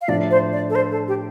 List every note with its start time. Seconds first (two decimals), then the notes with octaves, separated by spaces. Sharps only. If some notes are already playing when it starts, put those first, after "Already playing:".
0.02 F5
0.08 A2 F3 D4 D5
0.31 C5
0.53 D5
0.70 A4
0.75 C5
0.91 A4
1.08 G4